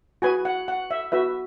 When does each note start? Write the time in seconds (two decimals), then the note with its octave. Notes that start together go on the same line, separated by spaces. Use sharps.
0.22 F#4 B4 G#5
0.45 F#5
0.68 F#5
0.91 E5
1.12 F#4 B4 E5